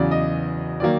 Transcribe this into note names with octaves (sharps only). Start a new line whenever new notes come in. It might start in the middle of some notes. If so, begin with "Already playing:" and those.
Already playing: E2 C#3 F#3 D5
D#5
D#3 F#3 A#3 D5